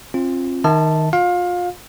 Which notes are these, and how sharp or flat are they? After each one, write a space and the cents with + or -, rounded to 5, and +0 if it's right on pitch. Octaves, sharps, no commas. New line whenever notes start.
C4 +35 F4 +0
D#3 +0 E5 -40 A5 +0
F4 +30 F5 +25